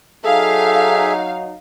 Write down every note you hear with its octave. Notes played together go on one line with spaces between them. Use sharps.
F#3 D#4 G#4 A4 E5 F5